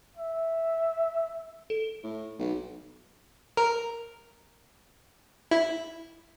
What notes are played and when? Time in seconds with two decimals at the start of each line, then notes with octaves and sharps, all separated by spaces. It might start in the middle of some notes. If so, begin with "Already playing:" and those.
0.17 E5
1.70 A4
2.03 A2
2.39 B1
3.57 A#4
5.51 E4